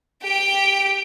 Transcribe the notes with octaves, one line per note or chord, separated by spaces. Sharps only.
G4 G5